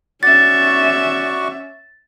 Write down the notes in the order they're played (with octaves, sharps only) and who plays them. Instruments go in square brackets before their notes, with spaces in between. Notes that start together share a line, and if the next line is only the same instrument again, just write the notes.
[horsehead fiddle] C#4 E5 [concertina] F#4 D5 C#6 [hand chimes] A6